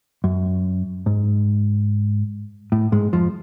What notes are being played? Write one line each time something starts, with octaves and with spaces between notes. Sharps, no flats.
F#2
G#2
A2
G#2 G#3
F2 F3